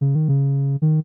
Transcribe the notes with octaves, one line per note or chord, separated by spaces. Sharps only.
C#3
D#3
C#3
D#3